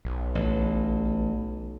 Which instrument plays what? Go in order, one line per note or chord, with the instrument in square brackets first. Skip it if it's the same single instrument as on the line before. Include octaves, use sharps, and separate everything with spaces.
[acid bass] B1
[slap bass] A1